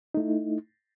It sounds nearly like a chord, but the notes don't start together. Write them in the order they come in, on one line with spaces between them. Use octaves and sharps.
D#4 A3 E4